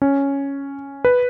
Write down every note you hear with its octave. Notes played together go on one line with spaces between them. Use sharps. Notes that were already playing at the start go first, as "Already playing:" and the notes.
C#4
B4